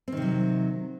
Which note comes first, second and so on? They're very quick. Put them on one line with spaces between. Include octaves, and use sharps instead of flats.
C4 D#3 C3 F#3